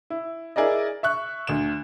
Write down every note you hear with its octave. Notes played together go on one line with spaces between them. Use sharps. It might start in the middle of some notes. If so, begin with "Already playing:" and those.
E4
E4 G#4 A#4 D5 D#5
E5 C#6 F#6
D2 E7